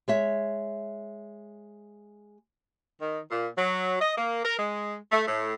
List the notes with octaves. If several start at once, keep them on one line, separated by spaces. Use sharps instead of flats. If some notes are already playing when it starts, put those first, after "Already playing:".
G#3 C#5 E5
D#3
A#2
F#3
D#5
A#3
A#4
G#3
A3
A2